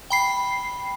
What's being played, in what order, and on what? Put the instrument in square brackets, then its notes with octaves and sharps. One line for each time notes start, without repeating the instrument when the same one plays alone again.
[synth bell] G5 B5 C7